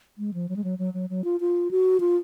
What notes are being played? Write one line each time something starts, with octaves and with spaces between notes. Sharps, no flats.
G#3
F3
F#3
G#3
F#3
F#3
F#3
F#3
F4
F4
F#4
F4